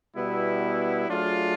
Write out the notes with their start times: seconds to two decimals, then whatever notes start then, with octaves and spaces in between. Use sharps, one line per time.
0.15 B2 G3 B3 E4
1.08 F#3 A3 D4 F4 G#4